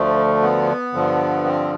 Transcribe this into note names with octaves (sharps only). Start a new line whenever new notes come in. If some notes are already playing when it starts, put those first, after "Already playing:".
Already playing: D2 D3 F3 A3
B3
G2 D3 F3
C4